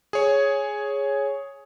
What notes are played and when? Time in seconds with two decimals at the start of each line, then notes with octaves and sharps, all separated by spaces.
0.13 G#4 C#5